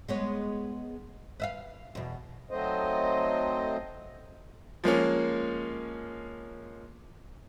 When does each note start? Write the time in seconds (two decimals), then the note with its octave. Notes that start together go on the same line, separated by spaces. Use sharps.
0.08 G#3 B3 C#5
1.40 B4 E5 F5
1.95 E2 B2
2.51 F#3 A3 C4 D#4 C5 D#5
4.84 F3 G#3 A#3 C#4